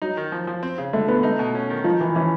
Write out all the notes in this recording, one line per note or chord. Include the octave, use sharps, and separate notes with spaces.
F#3 D#4
D#3
F3
F3
C4
C#3
D3 A3
D3 B3
A3 D#4
B2
C#4
D#3
F3 D#4
D#3 E3
E3 C#4